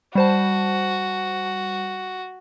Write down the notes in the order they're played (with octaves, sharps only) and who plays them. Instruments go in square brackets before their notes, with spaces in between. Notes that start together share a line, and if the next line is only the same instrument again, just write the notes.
[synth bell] G3 C5 A5 [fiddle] F#4